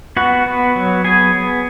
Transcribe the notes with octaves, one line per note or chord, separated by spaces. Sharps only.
B3 F#4 F#5
B3
F#3
B3 G#4 G#5
B3